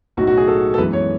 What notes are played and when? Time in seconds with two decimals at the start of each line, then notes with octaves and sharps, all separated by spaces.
0.17 B1 A2 F#3 F#4
0.27 F#4
0.37 G#4
0.48 A4
0.74 A4
0.78 F#2 E3 G#3 B3 B4
0.93 C#5